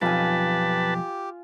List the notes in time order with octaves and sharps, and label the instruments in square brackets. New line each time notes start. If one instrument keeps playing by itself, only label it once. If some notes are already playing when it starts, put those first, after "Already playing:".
[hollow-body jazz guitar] B1 F2 [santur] F4 G#5 [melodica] G4 [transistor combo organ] B4 A5